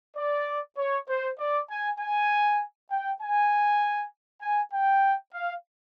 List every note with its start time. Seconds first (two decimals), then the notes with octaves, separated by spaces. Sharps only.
0.17 D5
0.78 C#5
1.09 C5
1.39 D5
1.70 G#5
1.99 G#5
2.91 G5
3.21 G#5
4.41 G#5
4.73 G5
5.33 F5